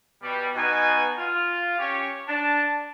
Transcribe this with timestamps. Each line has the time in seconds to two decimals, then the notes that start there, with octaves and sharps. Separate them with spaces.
0.22 B2 G3
0.55 B2 D#4 G#5
1.18 F4
1.78 C#4 G4 C#5
2.28 D4 A5